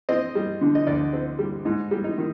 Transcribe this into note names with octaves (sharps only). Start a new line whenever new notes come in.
C4 D#5
G3
D3
D#5
D2 D5
C4
G3
G#2 D#4
G3
D#4
D#3